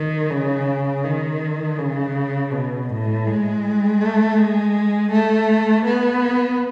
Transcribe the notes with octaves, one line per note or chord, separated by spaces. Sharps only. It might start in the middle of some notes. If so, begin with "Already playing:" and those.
Already playing: D#3
C#3
D#3
C#3
B2
A2
G#3
A3
G#3
A3
B3